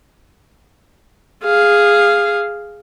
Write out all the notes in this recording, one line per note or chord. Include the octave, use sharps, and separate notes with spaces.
G#4 F5